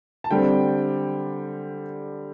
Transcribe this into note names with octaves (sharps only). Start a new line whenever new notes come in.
A5
D3 G3 C4 G5